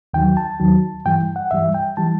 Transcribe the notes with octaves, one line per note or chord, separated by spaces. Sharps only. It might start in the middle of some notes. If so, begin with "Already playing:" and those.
D#2 D#3 F#3 G5
A5
D#2 D#3 F#3
G2 E3 G3 G5
F#5
G2 E3 G3 E5
G5
E3 G3 A5